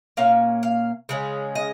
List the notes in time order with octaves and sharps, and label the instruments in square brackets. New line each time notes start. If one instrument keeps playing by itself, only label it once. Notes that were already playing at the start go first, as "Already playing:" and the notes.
[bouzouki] A#2 A#3 C#4 F5
F5
C#3 G#3 C#4
D#5